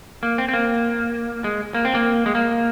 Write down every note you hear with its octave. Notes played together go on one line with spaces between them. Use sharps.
A#3
C4
C4
A#3
G#3
A#3
C4
A#3
G#3
A#3